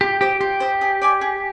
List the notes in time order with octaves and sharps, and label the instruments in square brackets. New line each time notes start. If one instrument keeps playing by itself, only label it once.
[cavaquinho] F4 [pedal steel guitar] G4
[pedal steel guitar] G4 [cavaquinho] C5 D#5
[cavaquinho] F4 [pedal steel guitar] G4
[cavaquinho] C5 D#5
G#4
D5 G#5 D6
G#4